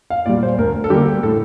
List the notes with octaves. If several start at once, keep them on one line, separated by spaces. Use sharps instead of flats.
F5
A#2 G3 D5
C5
D2 A#4
A4
D3 G3 A#3 D4 G4
A2 A4